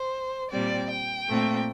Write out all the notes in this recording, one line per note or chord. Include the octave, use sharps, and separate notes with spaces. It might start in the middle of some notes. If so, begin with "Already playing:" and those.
Already playing: C5
A#2 G3 C4 D5
G5
A#2 A3 C4